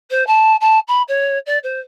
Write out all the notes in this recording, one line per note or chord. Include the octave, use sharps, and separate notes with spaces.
C5
A5
A5
B5
C#5
D5
C5